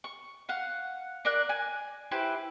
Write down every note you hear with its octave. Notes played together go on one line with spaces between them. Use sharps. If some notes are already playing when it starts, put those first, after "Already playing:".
C#6
F5 F#5
D4 A#4 D5 F#6
G#5
E4 G4 B4 C5